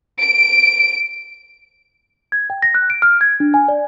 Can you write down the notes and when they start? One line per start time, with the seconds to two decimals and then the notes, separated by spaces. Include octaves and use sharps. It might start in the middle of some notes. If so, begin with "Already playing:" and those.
0.19 D7
2.32 G#6
2.50 G5
2.62 A#6
2.74 F#6
2.90 D7
3.02 F6
3.21 G#6
3.40 D4
3.54 G#5
3.68 D5